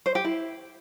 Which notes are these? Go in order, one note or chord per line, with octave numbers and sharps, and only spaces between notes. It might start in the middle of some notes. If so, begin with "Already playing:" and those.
C5
G4
E4